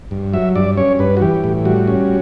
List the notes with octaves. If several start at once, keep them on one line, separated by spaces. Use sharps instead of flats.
G2
F#3 E5
G2 D5
C#4 C#5
G2 B4
F#4
E3 G4
A2
G3 F#4
C#4